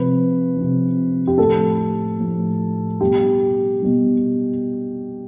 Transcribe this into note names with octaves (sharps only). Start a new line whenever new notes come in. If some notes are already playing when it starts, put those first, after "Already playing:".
Already playing: C3 F3 B4
C3 F3
G4
A2 F3 A4
A2 F3
B2 G3 G4
B2 G3